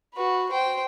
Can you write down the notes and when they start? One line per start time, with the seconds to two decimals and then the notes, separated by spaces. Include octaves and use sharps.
0.15 F#4 B4
0.50 C5 G5